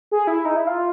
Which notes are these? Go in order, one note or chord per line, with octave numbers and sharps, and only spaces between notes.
G#4
E4
D#4
E4
F4